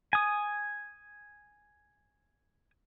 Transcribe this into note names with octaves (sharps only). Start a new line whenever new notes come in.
G#5 D#6